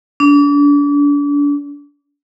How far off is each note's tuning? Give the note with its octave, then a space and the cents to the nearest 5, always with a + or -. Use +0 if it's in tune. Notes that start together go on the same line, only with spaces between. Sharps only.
D4 -35